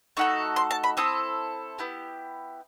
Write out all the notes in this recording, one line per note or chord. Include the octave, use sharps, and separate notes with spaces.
A3 D#4 F#4 A4
C6
A5
B5
C4 E4 A4 D#6
B3 E4 G4